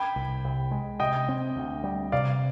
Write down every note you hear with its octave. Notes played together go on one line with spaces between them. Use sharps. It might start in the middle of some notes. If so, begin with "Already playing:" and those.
Already playing: G5 B5
C2
C2
G#3
C3 D#5 G5
C4
D2
G3
C3 D5 F5